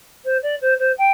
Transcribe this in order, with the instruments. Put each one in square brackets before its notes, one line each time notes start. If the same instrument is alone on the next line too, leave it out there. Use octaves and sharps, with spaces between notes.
[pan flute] C5
D5
C5
C5
G5